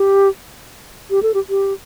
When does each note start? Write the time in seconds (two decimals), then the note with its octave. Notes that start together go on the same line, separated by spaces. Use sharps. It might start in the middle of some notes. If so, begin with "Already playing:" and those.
Already playing: G4
1.11 G4
1.23 A4
1.34 G4
1.50 G4